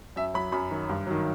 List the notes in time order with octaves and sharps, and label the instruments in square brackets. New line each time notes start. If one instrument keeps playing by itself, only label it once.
[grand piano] F#2 E5
F#3 B5
F#2 B5
D#3 F#3
G2
D#3 F#3